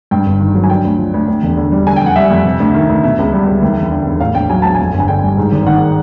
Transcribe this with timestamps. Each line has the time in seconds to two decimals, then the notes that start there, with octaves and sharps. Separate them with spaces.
0.11 G2 G5
0.26 G1
0.40 D#3
0.55 F#3
0.64 G#5
0.69 D3 G5
0.84 D2
0.99 F3
1.14 D2
1.28 D2
1.43 E1
1.57 D3
1.72 G3
1.86 D3 G#5
1.96 G5
2.02 F2 F#5
2.16 G3 E5
2.31 F2
2.45 C3
2.60 D2
2.74 D#3
2.89 D2
3.03 B2 E5
3.18 C#2
3.33 G3
3.47 C#2
3.62 D#2
3.76 E1
3.91 D3
4.06 E1
4.20 A2 F5
4.35 A#1 G5
4.50 F#3 G#5
4.62 A#1 A5
4.75 F2 G#5
4.94 G1
5.00 G#5
5.08 D3 G5
5.23 G3
5.37 G#2
5.52 G#1
5.66 D#3 F#5